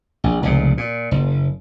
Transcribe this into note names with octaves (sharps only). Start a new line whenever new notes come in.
A#1
F1 C#2 A#2
A#2
F#1